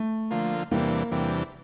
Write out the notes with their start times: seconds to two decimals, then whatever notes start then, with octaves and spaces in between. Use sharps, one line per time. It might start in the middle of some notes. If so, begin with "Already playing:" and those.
Already playing: A3
0.30 D3 F3 A#3 F4
0.71 E2 C3 E3 G3 A#3 D4
1.11 E2 C3 E3 G3 D4